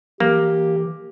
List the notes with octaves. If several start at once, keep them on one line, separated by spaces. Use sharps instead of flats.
E3 A#3 G4